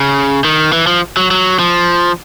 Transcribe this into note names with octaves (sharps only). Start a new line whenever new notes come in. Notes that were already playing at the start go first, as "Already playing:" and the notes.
Already playing: C#3
D#3
E3
F3
F#3
F#3
F3